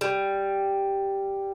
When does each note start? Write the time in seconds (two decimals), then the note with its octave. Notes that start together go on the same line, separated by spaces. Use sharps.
0.01 G3